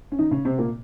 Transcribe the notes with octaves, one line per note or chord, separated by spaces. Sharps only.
C#4
D#3 D#4
C#3 C#4
C3 C4
A#2 A#3